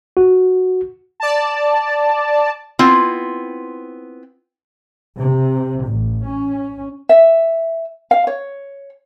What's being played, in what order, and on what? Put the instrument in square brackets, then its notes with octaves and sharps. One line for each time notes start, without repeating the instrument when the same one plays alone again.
[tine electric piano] F#4
[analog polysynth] D5 A5
[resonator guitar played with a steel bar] B3 C4 E4 F4
[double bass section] C3
A1
C#4
[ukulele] E5
F5
C#5